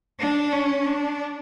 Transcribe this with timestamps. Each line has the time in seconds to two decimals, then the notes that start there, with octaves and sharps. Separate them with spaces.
0.19 D4
0.52 C#4
0.86 D4